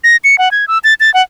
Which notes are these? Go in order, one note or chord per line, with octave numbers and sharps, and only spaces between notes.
A#6
C#7
F#5
G#6
E6
A6
A6
F#5